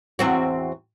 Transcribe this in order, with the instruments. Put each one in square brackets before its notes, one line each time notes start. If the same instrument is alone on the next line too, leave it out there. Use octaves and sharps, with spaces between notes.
[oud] E2 C4 F#4